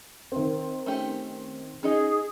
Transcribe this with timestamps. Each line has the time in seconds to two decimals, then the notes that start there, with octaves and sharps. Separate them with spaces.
0.32 D#3 C4
0.86 A3 C#4 G4
1.83 C#4 D#4 G#4 D#5